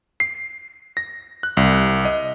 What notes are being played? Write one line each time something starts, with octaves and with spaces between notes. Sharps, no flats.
C7
A#6
F#6
C2
D#5